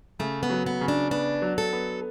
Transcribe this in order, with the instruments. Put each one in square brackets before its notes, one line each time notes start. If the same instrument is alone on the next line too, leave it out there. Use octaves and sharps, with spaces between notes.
[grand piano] C#3 [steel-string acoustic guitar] A3
[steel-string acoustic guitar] B3
[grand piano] F#3
[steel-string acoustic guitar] B3
[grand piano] C#3
[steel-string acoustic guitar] D4
[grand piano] B3 [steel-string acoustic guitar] D4
[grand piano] F#3
[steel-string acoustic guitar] A4
[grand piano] B3